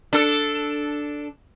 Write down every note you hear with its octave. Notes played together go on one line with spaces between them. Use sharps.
D4 A4